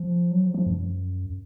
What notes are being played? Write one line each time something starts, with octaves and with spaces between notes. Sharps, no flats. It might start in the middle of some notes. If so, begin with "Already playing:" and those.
Already playing: F3
F#3
F3
F3
F#2